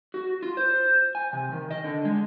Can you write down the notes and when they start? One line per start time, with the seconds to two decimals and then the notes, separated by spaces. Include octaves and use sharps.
0.14 F#4
0.43 F4
0.57 C5
1.15 G#5
1.33 C3
1.52 D#3
1.71 D#5
1.84 D3
2.05 G#3